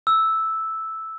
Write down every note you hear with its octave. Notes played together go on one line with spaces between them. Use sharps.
E6